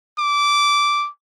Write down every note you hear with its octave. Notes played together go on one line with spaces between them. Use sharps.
D6